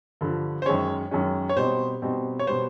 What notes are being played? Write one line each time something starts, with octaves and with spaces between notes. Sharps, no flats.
G2 D3 F3
C5
F#2 D#3 G#3 C#4 C#5
F#2 D#3 G#3 C#4
C#5
B2 G3 C4 D#4 C5
B2 G3 C4 D#4
C#5
B2 G3 B3 C5